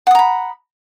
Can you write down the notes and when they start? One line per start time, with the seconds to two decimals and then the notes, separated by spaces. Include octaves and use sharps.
0.07 F#5
0.11 D#6
0.15 A#5
0.19 B5